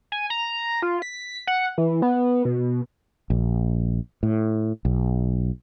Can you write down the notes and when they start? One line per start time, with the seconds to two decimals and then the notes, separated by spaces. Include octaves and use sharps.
0.12 G#5
0.30 A#5
0.82 F4
1.02 B6
1.47 F#5
1.78 E3
2.02 B3
2.45 B2
3.30 A#1
4.23 A2
4.85 B1